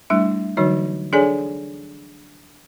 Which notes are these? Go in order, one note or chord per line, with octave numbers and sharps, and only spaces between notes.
G3 A3 D4 E4 E5
D3 E3 F#3 D#4 F#4 C#5
D4 G#4 A4 C#5 D5 G#5